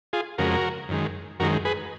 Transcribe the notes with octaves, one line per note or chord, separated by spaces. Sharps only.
F4 G#4
F2 C#3 G#3 F#4 A#4
F#2 D#3 G#3
F#2 D#3 G#3 F#4 A#4
G#4 B4